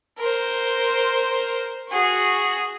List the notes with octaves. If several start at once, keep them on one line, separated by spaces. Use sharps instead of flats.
A#4 C5
F#4 G#4